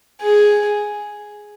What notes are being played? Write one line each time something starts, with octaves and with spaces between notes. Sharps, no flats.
G#4